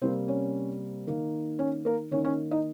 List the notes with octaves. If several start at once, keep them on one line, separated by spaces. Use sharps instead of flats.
C3 G3 A#3 C4 C5
C#4 C#5
D#3 A#3 D#4
C#4 C#5
A#3 A#4
D#3 A#3 C#4 D#4 C#5
C#4 C#5
D#4 D#5